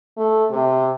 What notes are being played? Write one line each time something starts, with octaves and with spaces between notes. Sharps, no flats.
A3
C3